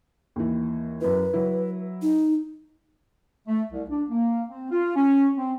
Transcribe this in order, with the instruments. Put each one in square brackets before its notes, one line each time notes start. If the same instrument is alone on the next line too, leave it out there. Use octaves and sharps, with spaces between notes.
[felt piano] D#2 E3
[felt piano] F#2 E4 [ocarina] B4
[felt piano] F#3 E4
[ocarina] D#4
[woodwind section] A3
C2
D4
A#3
C4
F4
C#4
C4